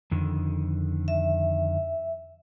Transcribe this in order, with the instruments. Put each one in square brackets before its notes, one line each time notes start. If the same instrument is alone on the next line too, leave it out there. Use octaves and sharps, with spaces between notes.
[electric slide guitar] F2 D3 D#3
[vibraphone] E5